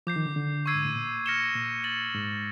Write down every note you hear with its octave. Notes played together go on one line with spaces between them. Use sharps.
F3 D6 G6 C7
D#3
D3
D3
C#6 E6 G#6 C7 D#7
G#2
A2
A#2
F6 A#6 C#7 E7 G7
A#2
A6 C#7 F#7
G#2